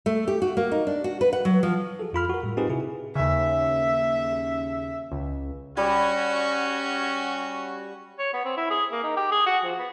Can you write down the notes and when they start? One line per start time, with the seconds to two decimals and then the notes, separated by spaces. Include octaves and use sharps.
0.06 A3
0.28 G4
0.42 F#4
0.57 A#3
0.72 D#4
0.87 D4
1.04 F#4
1.21 B4
1.33 F#5
1.45 F#3
1.63 F3
2.00 F#4 G#4 A4
2.13 F2 F4 B5 F6
2.30 F#4 A#4
2.43 A2 G3
2.57 C4 D#4 F4 G4 G#4 B4
2.69 C3 E4 F#4 G#4
3.15 D#2 C#3 E5
5.12 C#2
5.77 G3 C#4 F#4
8.19 C#5
8.33 B3
8.45 C4
8.57 E4
8.70 G#4
8.92 A#3
9.04 D#4
9.17 G4
9.32 G#4
9.46 F#4
9.64 F3
9.79 B3